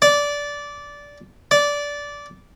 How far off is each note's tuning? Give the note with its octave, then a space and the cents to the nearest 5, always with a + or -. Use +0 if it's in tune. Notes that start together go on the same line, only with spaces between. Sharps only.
D5 -15
D5 -15